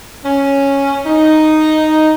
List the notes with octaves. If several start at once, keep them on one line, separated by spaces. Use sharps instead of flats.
C#4
D#4